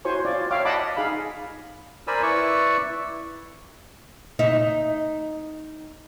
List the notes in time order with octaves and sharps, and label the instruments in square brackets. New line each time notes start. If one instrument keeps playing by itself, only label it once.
[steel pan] E4 F#4 C5 C#5 G#5 C#6
F4 C#5 D5
C#5 E5 F5 G5 D6
D5 D#5 F#5 A5 B5 D6
D#4 G#4 F5 B5
[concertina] A#4 C5 D5 G#5 B5 E6
E4 B4 D5 C#6 E6
[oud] D#4 E5